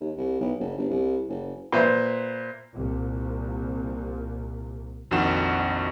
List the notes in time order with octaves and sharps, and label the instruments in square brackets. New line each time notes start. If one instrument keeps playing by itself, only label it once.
[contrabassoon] D#2
C2
B1
F#1
G1
C2
F#1
[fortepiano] A#2 B4 C5 E5
[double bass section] C2 A#2
[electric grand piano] A#1 F2 D#3 F#4 E7